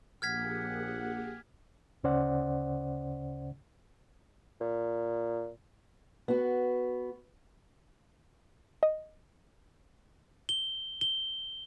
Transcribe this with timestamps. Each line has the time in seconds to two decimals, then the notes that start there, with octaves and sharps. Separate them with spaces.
0.22 A#1 A#3 G4 G#4 F#5 F6 G#6 B6
2.04 D2 C#3 C#4 C5 D5 F#5
4.61 A#2
6.28 B3 F#4
8.83 D#5
10.49 G7
11.01 G7